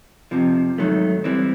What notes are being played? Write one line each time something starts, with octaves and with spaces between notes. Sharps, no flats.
F2 C3 F3
G#2 D#3 F#3 A3
E3 G3 C4